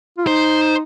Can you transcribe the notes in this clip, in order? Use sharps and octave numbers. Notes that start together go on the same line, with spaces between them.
F4
D#4 C5